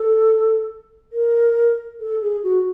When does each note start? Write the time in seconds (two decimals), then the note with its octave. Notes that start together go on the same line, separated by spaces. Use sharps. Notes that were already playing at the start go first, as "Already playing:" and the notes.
Already playing: A4
1.12 A#4
2.00 A4
2.21 G#4
2.43 F#4